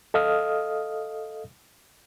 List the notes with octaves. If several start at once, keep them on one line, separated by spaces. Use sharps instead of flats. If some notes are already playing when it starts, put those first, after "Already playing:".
A4 D#5 F5 D#6 F6